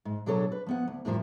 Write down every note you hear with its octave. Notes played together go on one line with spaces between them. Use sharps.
G#2
B2 F#3 D4 G#4 A4 C#5
B4
F3 B3 F#5
D2
F2 A2 D#3 F3 G3